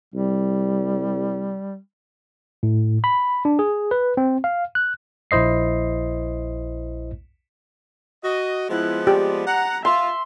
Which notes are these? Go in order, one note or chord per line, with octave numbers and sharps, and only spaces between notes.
C2 G3
A2
B5
D4
G#4
B4
C4
F5
F#6
A#1 E4 C5 D#5 C7
F#4 D#5
F3 G#3 B3 E4 F#6
G4 D5
F#5 A#5
F4 E5 C6